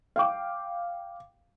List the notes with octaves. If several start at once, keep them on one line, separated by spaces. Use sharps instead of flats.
F5 G5 D6